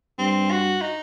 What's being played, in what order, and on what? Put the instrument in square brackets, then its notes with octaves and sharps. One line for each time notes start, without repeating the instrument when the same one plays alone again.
[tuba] G2 [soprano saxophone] C4
[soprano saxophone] F#4
D#4